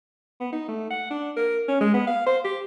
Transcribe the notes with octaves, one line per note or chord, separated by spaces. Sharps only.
B3
D#4
A3
F#5
D4
A#4
C#4
G#3
B3
F5
C5
G4